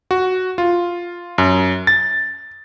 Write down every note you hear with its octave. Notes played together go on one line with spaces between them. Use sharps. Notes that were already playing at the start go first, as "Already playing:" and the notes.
F#4
F4
F#2
A6